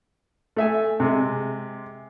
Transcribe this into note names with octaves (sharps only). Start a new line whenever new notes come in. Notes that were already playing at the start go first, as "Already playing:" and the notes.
A3 E5 G#5
C3 G#3